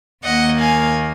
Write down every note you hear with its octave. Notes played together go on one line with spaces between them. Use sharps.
D#2 D#3 A#3 D#5 F#5
F5 G#5